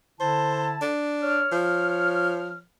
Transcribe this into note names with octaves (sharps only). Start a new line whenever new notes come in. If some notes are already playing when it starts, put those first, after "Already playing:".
D3 E4 C5 A5
D4
C#5 F6
F3